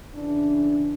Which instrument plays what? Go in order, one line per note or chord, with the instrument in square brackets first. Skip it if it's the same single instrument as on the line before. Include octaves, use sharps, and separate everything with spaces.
[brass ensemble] C#3 E3 D4